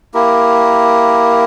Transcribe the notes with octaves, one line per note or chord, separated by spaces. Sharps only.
A#3 E4 G4 A#4